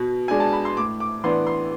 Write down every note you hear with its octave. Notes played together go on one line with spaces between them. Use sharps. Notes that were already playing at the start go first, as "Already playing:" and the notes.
Already playing: B2
G#3 D4 G#5
A5
B5
C6
A2 D6
D6
E3 B3 D4 C6
C6